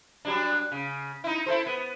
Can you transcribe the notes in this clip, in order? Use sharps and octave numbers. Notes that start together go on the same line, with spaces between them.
F#3 G3 D4
C#3
D#4 E4
E4 A4 C5
B3